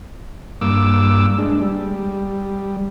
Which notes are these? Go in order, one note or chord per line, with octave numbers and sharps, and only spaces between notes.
G2 A#3 D6 E6
G#3 D4
G3